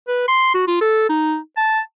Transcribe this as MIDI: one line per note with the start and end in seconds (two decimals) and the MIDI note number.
0.08 0.26 71
0.28 0.50 84
0.55 0.64 66
0.67 0.80 65
0.81 1.09 69
1.10 1.38 63
1.57 1.80 81